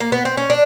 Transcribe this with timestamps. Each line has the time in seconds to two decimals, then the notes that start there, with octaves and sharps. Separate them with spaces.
0.00 A#3
0.12 B3
0.25 C4
0.37 C#4
0.50 D4